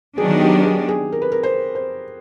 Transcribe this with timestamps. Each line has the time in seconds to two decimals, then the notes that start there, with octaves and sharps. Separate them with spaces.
0.17 D#3 F#3 B3 D4 G#4
0.41 G4
0.65 G#4
0.88 G#4
1.12 A#4
1.22 B4
1.32 A#4
1.43 C5
1.75 C5